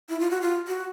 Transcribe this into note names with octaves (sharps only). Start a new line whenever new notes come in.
E4
F4
F#4
F4
F#4